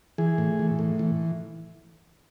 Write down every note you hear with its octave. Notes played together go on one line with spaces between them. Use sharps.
E3 G#4
A2
E3
A2
E3